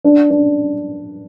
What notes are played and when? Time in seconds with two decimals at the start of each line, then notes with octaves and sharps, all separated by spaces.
0.04 D4
0.30 D4